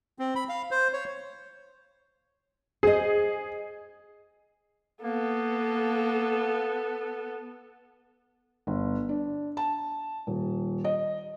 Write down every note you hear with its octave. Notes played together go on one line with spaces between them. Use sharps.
C4
B5
F5
C5
C#5
G#4 C5 D#5
A#3 B3 A4
G1
D4
A5
D#1
D#5